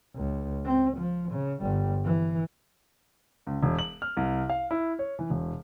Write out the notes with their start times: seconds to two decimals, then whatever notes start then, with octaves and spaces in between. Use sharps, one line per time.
0.15 C#2
0.65 C4
0.97 F3
1.32 C#3
1.61 G1 G3
2.04 E3
3.47 C#2
3.63 E1
3.79 F#7
4.02 F6
4.17 C2
4.50 F5
4.71 E4
4.99 C#5
5.19 E3
5.30 E1